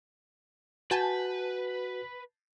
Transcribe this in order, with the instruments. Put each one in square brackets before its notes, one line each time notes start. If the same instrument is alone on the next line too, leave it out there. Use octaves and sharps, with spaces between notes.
[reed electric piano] F#4 [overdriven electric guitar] B4 [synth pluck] G#5 A5 G6